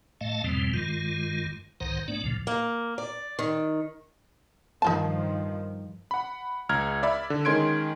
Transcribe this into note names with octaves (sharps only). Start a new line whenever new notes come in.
A2 A3 D#5 F5 A5
E2 G#2 B2 F3 G3 C4
G2 D#3 G#3 F4
C2 G#2 D#3 C5 F#5 A#5
G#2 A3 B3 D4 D5
D2 A#2 C#3 F3
A#3
D5
D#3
G2 D#3 F3 D#4 F4 A5
F#5 B5
C#2 A#5 F6 G#6
D5 E5 B5
D3
D#3 G#3 C#4 C6 G#6 D7